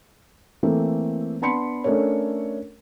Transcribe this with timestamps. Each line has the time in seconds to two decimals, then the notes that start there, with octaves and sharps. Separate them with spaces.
0.63 E3 A3 A#3 C4 A4
1.42 B3 D4 A5 B5 C6 C#7
1.84 A3 C#4 D4 A4 A#4 C#5